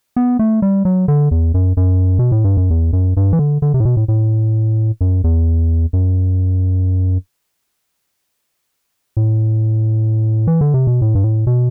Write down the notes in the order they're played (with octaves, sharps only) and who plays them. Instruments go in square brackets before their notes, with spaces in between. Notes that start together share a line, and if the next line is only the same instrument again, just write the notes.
[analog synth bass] B3
A3
G3
F#3
D3
E2
F#2
F#2
B2
A2
G2
F#2
E2
F#2
G2
E3
D3
D3
C3
A2
B2
A2
A2
F#2
E2
F#2
A2
E3
D3
C3
B2
A2
G2
A2
B2